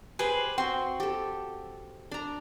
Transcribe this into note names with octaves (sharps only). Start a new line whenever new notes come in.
G4 G#4 B4 C5 G#5
C4 F#4 G5 C6
G4 A4
D4 A#5